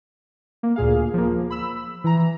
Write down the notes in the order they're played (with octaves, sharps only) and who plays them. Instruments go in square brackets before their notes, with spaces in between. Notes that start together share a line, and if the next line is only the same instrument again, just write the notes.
[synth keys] A#3
D2 A#2 G#4 F5
F3 A#3
B5 E6
E3 A#5